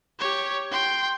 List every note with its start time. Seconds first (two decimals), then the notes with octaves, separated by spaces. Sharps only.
0.19 G4 C#5
0.71 G5 C6